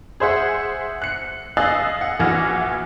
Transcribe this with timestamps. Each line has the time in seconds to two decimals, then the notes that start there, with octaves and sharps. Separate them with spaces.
0.20 G#4 C5 E5 F#5
1.02 F#6 C#7
1.57 D#5 F5 G#5 E6 F#6 A6
2.01 F#5
2.20 A#1 E3 F#4 F6 A#6